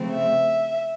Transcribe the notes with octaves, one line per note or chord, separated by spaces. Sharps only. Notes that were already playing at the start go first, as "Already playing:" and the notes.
Already playing: C#3 F3 A3 C4
E5